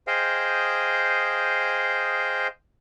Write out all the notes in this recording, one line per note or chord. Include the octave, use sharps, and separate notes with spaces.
G#4 C5 D#5 F5 G5